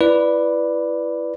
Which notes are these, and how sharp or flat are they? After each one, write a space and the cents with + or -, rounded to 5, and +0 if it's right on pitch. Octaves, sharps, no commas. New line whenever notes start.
E4 +25 B4 +0 D5 +0